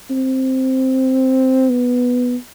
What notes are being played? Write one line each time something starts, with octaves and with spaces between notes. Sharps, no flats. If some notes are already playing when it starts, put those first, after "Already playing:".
C4
B3